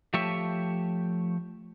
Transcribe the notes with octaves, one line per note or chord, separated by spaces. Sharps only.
F3 A3 G4 C#5 E5